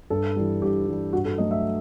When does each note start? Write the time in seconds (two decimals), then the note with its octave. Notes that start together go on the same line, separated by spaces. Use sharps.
0.10 G2 A4
0.36 E3 G3
0.62 G2 G4
0.87 E3 G3
1.13 G2 F#4
1.25 A4
1.38 F#3 A3 D#5
1.51 E5